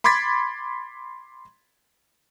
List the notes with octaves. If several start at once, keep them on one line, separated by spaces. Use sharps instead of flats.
B5 C6 D6 G#6 A6 B6